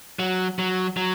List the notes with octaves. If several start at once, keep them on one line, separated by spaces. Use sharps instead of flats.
F#3
F#3
F#3